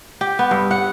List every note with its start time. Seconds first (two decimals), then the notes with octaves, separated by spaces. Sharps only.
0.21 G4
0.39 B3
0.51 G2
0.71 F#5